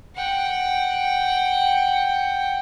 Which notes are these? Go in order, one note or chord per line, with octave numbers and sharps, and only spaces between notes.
F#5 G5